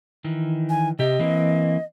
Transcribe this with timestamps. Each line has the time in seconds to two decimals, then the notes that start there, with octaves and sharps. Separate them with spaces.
0.24 D#3 E3
0.69 G#5
0.99 C3 G4 D#5
1.19 E3 A#3 C4